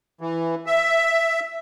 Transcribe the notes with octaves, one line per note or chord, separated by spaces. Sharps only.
E3
E5